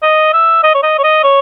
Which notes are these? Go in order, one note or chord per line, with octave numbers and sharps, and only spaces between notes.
D#5
E5
D#5
C#5
D#5
C#5
D#5
C#5